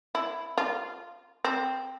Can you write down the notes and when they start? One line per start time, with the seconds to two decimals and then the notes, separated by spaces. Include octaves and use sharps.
0.15 E4
0.58 F4
1.44 C4